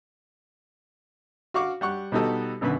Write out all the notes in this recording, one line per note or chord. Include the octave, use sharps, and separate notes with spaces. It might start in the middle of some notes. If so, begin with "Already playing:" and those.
F#4 F5 C#6 D6 F6
G3 F#5 C#6 F#6
B2 G3 B3 D#4 F#4 A4
G#1 F#2 B2 D3 B4 B5